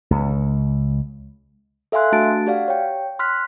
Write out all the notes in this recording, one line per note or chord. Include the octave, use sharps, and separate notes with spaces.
C#2
A4 E5 F5 G#5 C6 F#6
A3 D4 F#4 A5 A6 D7
G4 D5 F5 F#5
C#5 G5
C6 F6 F#6 B6